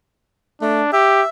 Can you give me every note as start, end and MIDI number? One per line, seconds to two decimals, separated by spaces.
0.62 0.82 57
0.62 0.93 62
0.93 1.22 67
0.93 1.29 76